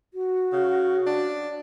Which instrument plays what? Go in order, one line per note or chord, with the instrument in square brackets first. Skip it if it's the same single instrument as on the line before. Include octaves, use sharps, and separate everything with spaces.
[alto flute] F#4
[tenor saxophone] C#3
D4